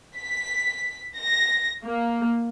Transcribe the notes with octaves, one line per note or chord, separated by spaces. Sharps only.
B6
A#6
A#3